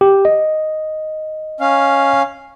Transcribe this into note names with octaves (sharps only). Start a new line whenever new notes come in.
G4
D#5
C#4 F5